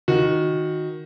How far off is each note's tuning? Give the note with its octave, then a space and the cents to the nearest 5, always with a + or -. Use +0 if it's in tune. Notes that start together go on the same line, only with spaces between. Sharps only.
D#3 +5 F#4 -15